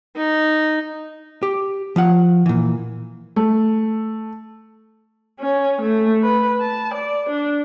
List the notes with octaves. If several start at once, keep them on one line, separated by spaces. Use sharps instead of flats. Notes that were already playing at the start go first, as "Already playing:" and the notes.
D#4
G4
F3 F4 F#5
A#2 E3
A3
C#4
A3
B4
A5
D5
D4